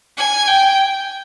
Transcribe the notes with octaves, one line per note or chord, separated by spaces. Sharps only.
G#5
G5